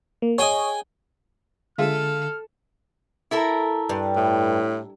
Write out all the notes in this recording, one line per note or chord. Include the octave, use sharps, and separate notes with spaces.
A#3
G#4 C#5 D#5 G5 G#5
D3 G#3 F4 A4 E5 F6
E4 A4 A#4
G2
A2